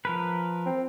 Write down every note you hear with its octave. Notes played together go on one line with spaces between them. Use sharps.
F3 A#4 B4
C4